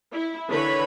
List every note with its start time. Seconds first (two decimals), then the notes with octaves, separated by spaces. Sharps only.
0.14 E4
0.50 D3 E3 B4 C#5 B5